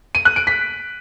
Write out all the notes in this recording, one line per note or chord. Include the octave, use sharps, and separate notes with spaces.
D#7
F#6
D7
B6